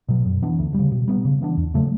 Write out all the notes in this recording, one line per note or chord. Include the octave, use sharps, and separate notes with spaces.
B2 F#3
F#2
E3 B3 D4
D2
C#3 G3
B2
G3 B3
C#3
E3 B3 D4
E2
C#3 F#3 A3